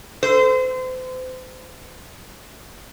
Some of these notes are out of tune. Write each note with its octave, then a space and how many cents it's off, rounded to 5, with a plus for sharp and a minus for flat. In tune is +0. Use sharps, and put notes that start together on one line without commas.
C5 -35